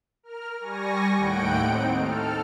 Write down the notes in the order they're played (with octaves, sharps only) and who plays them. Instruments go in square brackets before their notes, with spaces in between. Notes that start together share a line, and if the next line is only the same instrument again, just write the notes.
[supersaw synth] A#4 F6
G3 G#5 C#6 A#6
D#2 A2 F#5 G5 D7
C4 D#4
A4 F6